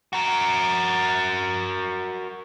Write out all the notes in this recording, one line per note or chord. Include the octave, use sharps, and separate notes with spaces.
F#4 A#4